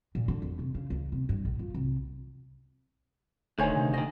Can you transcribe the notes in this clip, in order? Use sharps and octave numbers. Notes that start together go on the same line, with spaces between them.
A#2
D3
F2
C3
C#3
C#2
C3
G2
A#1
F4
C2
E1 D2 D#3 C5 C#5 G#5
C3
D2 D#3 D#5